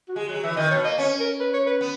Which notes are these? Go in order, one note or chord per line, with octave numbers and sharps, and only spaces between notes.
F#4
G#3 G#4
F#3 G#4
E3 E5
D#3 D#5
B2 C#5
A#3 D#5
C#4 C#5
A#4
B4
C#5
B4
B3